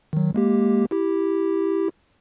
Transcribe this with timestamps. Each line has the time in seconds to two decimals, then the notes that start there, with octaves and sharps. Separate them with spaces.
0.13 D#3 F#3
0.34 G#3 A#3 G4
0.91 E4 G4